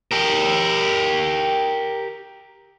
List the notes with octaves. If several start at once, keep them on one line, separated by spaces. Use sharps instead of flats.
G4 A#4